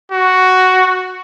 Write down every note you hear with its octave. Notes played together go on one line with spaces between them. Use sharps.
F#4